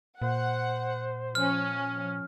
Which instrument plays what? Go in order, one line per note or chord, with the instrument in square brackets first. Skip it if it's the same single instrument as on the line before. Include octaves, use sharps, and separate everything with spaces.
[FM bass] A#2 [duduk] C5 [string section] F#5
[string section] F3 C#4 [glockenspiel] F6